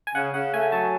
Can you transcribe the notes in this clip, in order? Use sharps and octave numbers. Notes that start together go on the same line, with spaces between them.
G#5
C#3 F#5
C#3 F#5
A3 G#5
F#3 A5